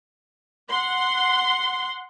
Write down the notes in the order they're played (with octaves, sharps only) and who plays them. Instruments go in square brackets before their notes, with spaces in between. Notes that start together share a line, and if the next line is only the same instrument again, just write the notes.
[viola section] F#5 C6